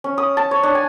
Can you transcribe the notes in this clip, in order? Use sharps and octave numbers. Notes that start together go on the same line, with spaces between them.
C#4
D#6
A5
C#5
D4
G#5